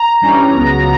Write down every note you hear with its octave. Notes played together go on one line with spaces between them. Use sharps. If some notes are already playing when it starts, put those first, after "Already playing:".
Already playing: A#5
G2 E3 G3 C#4
C#2 C#3 F#3 B3